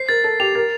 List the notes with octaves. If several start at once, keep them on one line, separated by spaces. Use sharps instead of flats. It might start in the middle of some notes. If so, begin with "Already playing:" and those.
Already playing: C5 C7
A#4 A6
A4 A6
G4 F7
A#4 A6